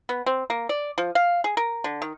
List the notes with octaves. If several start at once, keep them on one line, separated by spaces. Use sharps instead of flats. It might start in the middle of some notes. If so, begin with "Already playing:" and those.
B3
C4
A#3
D5
F3
F5
G#4
A#4
D3
D#3